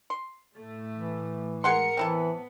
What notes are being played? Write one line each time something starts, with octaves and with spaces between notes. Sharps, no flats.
C6
A2 A3
E3
G#3 G#4 A#4 F#5 C6 C#7
E3 B3 C4 E4 A4